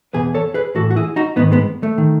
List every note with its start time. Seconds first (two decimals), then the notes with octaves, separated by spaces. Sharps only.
0.13 E2 B2 G#4 B4
0.34 A4 C#5
0.54 G#4 B4
0.75 A2 E3 F#4 A4
0.91 F#4
0.96 E4 G#4
1.16 D#4 F#4
1.36 G#2 D#3 B3 D#4
1.52 G#3 B3
1.83 A3
1.98 D#3